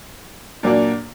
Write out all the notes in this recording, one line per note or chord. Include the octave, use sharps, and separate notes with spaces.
A#2 F#3 A#3 D4